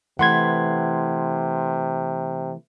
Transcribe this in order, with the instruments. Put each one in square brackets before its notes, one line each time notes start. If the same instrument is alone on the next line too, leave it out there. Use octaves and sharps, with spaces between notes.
[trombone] C3 [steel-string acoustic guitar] E3 A3 B4 [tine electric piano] F#5 C6 G#6